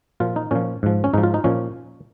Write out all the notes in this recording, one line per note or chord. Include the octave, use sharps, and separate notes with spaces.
A#2 F3 F4
D#4
A#2 F3 C#4
G#2 F3
C#4
G#2 F3 D#4
F4
D#4
A#2 F3 C#4